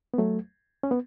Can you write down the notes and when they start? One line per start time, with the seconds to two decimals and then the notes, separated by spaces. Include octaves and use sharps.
0.14 B3
0.18 F#3 A3
0.83 C#4
0.91 B3